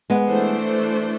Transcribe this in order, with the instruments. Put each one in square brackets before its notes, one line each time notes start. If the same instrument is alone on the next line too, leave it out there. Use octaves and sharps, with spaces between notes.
[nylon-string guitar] G#3 B3
[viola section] E3 A3 D4 A4 C5